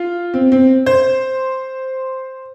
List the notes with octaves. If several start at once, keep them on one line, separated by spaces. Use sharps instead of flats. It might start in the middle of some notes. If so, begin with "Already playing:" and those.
Already playing: F4
C4
C4
C5